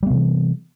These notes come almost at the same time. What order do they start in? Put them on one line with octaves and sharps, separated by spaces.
G3 B3 C3 E3